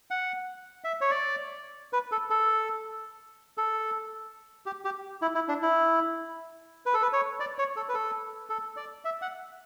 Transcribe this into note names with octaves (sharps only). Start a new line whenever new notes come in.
F#5
E5
C#5
D5
B4
A4
A4
A4
G4
G4
E4
E4
D4
E4
B4
A4
B4
C#5
D5
C#5
A4
B4
A4
A4
D5
E5
F#5